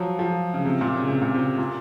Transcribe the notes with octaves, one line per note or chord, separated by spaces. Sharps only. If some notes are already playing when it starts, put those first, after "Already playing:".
Already playing: F3 F#3
F3
C#3
C3
A#2
C#3
C3
A#2
C3
A#2